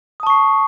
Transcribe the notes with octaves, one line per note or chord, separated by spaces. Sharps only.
A5 C#6 D#6 C7